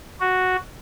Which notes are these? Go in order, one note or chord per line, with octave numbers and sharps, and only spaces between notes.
F#4